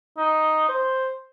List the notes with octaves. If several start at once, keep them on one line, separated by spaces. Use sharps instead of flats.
D#4
C5